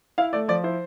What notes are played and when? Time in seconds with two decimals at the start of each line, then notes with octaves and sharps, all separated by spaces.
0.18 E4 F5
0.33 A3 D5
0.48 F3 D5
0.64 E4 C5